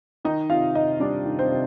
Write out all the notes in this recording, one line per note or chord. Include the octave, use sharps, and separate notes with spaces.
D#3 D#4 D#5
C3 F4 F5
C3 D#4 D#5
G3 D4 D5
D#3
C4 C5
C3